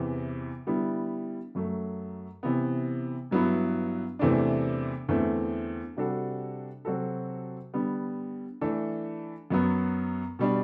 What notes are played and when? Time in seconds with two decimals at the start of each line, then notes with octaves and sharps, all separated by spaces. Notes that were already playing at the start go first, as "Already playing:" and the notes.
Already playing: E2 C3 E3
0.67 D3 G3 B3 E4
1.55 F#2 F#3 A3
2.43 C3 E3 B3
3.31 G2 F#3 B3 E4
4.19 E2 C3 E3 A3 D4
5.08 E2 D3 A3 C4
5.97 C3 G3 D4 F#4 A4
6.85 C3 F#3 C4 F#4 A4
7.74 D3 G3 B3
8.61 E3 A3 D4 A4
9.50 F#2 F#3 B3
10.39 B2 G3 D4